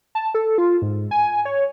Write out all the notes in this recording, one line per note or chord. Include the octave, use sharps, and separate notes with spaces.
A5
A4
F4
G#2
G#5
C#5